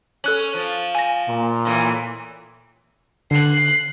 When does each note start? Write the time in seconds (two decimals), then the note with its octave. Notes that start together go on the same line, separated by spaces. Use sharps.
0.24 C#4 A4 F#6 F#7
0.54 F3
0.95 G#5 A#6
1.29 A#2
1.65 A2 E3
3.31 D3 F#6 C7